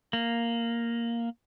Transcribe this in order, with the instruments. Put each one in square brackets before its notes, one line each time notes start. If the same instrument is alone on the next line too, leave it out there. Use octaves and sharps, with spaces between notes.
[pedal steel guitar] A#3